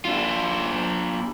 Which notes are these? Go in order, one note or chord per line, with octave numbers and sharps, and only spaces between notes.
D4 F4